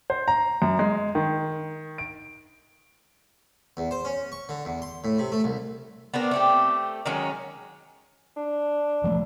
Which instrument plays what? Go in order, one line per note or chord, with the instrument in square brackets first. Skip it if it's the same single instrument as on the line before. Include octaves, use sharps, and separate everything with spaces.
[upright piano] C5
A#5
F#2
G#3
D#3
D7
[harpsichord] E2
C5
C#4
C#6
D3
E2
C6
A2
C3
A3
C2
[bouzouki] B3 C4 D4 A#4
A3 C4 G4
D#3 F#3 G#3 C#4
[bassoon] D4
[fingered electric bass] E3 F3 A3